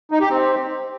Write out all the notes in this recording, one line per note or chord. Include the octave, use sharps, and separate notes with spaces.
D#4
G4
C4